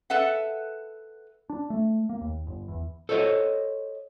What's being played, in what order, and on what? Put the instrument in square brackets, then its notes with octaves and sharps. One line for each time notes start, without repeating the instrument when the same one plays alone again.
[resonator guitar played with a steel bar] A4 B4 E5 F#5
[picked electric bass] D4
A3
A#3
D#2
G1
E2
[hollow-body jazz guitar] A4 C5 C#5 D#5